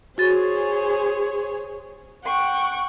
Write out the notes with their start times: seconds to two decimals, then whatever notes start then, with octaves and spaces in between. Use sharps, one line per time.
0.18 F#4 G#4 C5 C#5 A6
2.25 F#5 G5 C#6